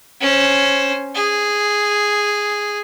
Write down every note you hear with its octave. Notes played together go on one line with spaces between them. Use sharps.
C#4 C5
G#4